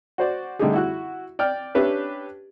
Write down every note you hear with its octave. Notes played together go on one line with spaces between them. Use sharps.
F#4 C5 D5
D3 G3 A3 D#4 G4 G#4
E4 F#4 F#6
D5 G5 F6
C#4 D4 G4 B4 E5